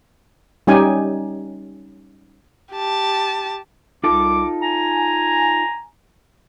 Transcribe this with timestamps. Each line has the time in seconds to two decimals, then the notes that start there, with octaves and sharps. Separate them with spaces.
0.67 G3 C#4 D#4 G4 G#5
2.74 G4 A5
4.04 C2 D#4 F4 A4 D6
4.62 G#5 A#5